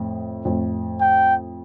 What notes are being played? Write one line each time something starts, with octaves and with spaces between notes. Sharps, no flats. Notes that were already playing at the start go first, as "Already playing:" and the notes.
Already playing: F2 A2
F2 A2
G5